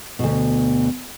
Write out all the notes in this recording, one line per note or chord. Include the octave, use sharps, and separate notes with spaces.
D2 B2